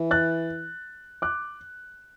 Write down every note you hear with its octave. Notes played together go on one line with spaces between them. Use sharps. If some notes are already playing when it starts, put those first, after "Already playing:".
Already playing: E3
F#6 A6
D6 F#6